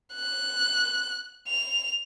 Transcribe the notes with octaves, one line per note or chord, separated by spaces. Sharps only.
F#6
F7